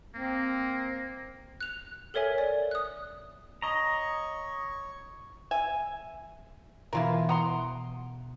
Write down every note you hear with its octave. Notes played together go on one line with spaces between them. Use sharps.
A#3 C4
F#6 F7
A4 A#4 C#5 E5 G#5
D5
D#6 F#6
C#5 D#5 A#5 C#6
E5 G#5
B2 E3 E4 F4 A#4
F#5 A#5 C6 D#6 D7